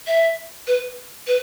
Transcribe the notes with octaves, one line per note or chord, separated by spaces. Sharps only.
E5
B4
B4